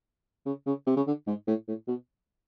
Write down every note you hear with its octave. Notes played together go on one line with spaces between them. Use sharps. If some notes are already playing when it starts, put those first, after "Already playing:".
C#3
C#3
C3
C#3
D3
G#2
A2
A2
B2